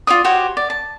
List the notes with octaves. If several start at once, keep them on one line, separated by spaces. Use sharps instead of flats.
F4 C#5 D5 D#6
F#4 G4 C5 C#5
D5
A5